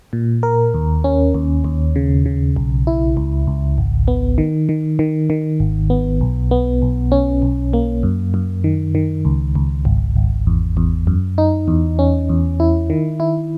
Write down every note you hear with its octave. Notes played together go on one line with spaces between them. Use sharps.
A#2
A#4
D#2
C#4
D#2
D#2
C#3
C#3
B1
E4
C#2
C#2
G#1
B3
D#3
D#3
D#3
D#3
G#1
B3
B1
B3
B1
C#4
B1
A#3
F#2
F#2
D#3
D#3
C#2
C#2
G#1
G#1
E2
E2
F#2
D#4
E2
C#4
E2
E4
D#3
E4